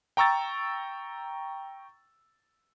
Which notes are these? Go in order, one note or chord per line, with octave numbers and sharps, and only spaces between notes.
G5 A#5 C#6 E6 A6